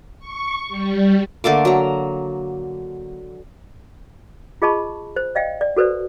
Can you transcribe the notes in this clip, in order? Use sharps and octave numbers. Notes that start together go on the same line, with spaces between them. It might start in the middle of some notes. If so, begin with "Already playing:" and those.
C#6
G3
D3 A3 A#3 D6
F#3 A#5
F4 G#4 D#5 A5 B5 C#6
C5
D5 D#5 F5 G5
D5
F#4 A4 B4 C5 D5